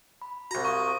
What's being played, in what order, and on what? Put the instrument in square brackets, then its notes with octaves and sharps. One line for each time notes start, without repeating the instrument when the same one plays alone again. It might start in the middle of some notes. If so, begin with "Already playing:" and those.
[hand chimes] B5
[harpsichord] C2 A#5 [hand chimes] F#4
[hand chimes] F5 D#6 [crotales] C#6